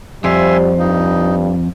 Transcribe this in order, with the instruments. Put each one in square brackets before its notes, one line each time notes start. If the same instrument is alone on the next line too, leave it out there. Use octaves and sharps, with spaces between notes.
[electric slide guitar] F2 [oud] F3 [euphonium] G3 [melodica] E5 G#5 C6
[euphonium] G2 [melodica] D#4